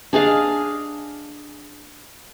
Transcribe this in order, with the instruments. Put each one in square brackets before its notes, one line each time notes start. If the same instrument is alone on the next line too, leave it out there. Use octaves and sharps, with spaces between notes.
[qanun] D4 G#4 D#5 F5